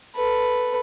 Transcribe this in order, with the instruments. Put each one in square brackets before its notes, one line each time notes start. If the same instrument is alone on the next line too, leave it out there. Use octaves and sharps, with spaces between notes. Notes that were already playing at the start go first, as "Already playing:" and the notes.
[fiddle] A4 B4